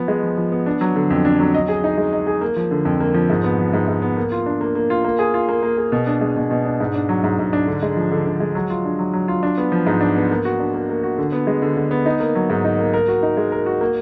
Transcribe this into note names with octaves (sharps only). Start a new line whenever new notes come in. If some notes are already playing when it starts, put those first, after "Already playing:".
Already playing: F3 B3
G#3
F3
F3
B3
D4
F#3
D3
F2
D4
F#3
D#5
G#4
D#4
G#3
D#5
G#4
A#3
F3
D3
F2
A#3
F3
G#2
B3
F3
G#2
G#2
B3
A#3
F4
D4
A#3
A#3
F4
A#3
G#4
F4
A#3
A#3
G#4
B2
D4
G#3
B2
B2
D4
G#2
D4
F#3
G#2
G#2
D4
D3
G#3
F3
D3
D3
G#3
F#3
F4
D4
F#3
F#3
F4
D4
B3
F3
G#2
D4
B3
A#3
F#4
D4
A#3
A#3
F#4
D3
B3
G#3
D3
D3
B3
D#4
A#3
F#3
G#2
D#4
A#3
A#4
F#4
D#4
G#3
A#4
F#4
A#3